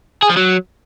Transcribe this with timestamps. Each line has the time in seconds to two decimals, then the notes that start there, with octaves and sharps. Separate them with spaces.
0.23 G#4
0.30 F3
0.37 F#3